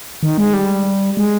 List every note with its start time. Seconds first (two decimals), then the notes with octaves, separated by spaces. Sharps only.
0.23 D#3
0.38 G#3
0.54 G3
1.17 G#3